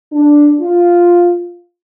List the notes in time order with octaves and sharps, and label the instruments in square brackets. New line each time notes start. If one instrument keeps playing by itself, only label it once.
[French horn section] D4
F4